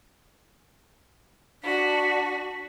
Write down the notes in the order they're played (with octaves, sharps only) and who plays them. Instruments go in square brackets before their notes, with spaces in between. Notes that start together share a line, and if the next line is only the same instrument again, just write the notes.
[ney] D4 [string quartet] F#4 [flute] B6